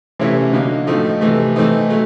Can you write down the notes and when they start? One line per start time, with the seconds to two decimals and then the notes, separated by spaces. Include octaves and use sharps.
0.19 C3 E3 A3 C#4 E4
0.53 D3 F#3 A#3 D#4
0.87 A2 F3 A3 C4 D#4
1.21 C3 E3 A3
1.56 E3 A3 C4 D#4
1.90 F#3 A3